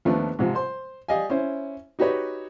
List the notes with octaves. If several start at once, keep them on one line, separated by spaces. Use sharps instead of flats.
D#2 F3 A3 B3 D4
G#2 C3 F3
C5 C6
G4 D5 D#5 F5 G#5
C#4 E4 C5
D#4 F#4 G4 B4 C#5